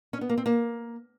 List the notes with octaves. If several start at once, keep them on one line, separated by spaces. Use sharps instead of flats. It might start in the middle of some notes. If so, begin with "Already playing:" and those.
C#4
B3
A#3
C4
A#3